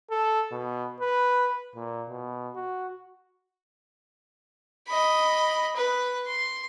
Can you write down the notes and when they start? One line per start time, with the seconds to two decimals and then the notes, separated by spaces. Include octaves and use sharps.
0.10 A4
0.51 B2
1.00 B4
1.75 A#2
2.08 B2
2.55 F#4
4.88 D#5 B5
5.76 B4
6.27 C6